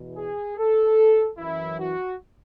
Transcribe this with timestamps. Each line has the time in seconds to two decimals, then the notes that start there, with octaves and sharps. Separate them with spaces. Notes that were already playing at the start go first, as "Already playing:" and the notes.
Already playing: E2 B2
0.16 G#4
0.57 A4
1.38 F#2 E3 E4
1.78 F#4